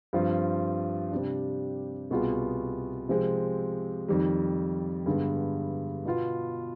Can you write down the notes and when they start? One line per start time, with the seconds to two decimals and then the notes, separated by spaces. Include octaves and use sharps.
0.13 G2 F3 C4 F4
1.11 C3 G3 D4
2.10 C2 B2 B3 F4 G#4
3.09 C3 F3 G#3 C4
4.08 F2 D#3 G3
5.06 G2 D3 G#3 B3
6.05 B2 B3 F4